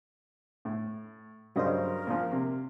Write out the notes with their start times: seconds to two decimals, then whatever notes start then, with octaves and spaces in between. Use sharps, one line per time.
0.65 A2
1.56 G2 C#3 F#3 A#4 C5 D#5
2.07 A#2 F3 A#3
2.32 C3